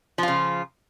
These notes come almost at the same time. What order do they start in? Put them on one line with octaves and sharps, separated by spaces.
F3 F4 C#3